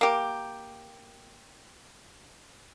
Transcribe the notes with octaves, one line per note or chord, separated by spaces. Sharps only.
A#3 G4